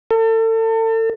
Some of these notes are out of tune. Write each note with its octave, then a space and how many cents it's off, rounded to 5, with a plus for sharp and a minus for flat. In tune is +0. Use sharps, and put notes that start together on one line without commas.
A4 +35